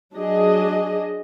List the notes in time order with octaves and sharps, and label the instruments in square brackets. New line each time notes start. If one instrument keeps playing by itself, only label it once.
[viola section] F#3 D4 G#4 D#5